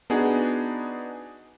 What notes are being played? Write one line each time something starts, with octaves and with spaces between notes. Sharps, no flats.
B3 D4 D#4 F#4 G#4